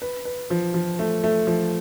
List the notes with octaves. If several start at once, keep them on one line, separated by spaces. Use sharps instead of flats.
B4
B4
F3
F3
A3
A3
F3